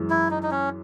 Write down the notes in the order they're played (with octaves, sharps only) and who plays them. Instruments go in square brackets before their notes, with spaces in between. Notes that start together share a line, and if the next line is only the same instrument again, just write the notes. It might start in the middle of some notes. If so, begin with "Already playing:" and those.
Already playing: [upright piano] F#2 E3 G#3
[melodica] E4
D#4
D#4
C#4